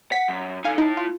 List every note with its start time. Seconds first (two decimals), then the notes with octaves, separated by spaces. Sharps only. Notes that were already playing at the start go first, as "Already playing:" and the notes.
0.12 F#5 B6
0.28 F#2
0.64 D#4 A4 F5 G#5
0.78 D#4 E4 A5
0.97 F4